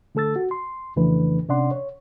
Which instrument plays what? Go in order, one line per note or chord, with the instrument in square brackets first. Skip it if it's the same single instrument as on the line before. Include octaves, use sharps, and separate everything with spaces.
[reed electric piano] D3 A3 A4 E6 A6
F#4
C6
F2 C#3 E3 A3 D4 B4
C3 C#4 D4 D5 F#5 C6
C#5